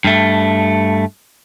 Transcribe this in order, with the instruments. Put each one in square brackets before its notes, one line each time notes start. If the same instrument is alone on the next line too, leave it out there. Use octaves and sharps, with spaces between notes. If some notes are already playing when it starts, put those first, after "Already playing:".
[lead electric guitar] G2 A3